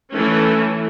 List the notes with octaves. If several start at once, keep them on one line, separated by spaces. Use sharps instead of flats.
E3 A3 C#4